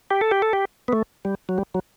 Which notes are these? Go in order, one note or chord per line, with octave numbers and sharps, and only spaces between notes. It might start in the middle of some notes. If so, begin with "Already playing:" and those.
G4
A4
G4
A4
G4
B3
A3
G3
F#3
G3
F#3